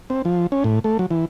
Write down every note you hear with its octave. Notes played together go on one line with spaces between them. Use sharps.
C4
F3
C#4
A2
A3
F#3
E3